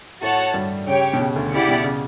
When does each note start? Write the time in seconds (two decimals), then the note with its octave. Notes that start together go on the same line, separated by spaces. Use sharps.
0.22 A2 A3 F#4 C#5 F#5 A5
0.54 G2 G3
0.87 C#3 G4 C#5 G5
1.13 B2
1.19 C#3
1.36 D2 D3
1.52 C#3 E4 G4 D5 F#5
1.68 B2
1.84 C#3